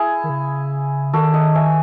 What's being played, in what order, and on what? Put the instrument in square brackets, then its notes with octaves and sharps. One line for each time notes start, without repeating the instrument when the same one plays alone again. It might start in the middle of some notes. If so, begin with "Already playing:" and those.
Already playing: [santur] E4 G#4
[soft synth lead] D#3
C#3
[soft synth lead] D#3 [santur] F#4 A4
[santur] D#5 F#5
E5 G#5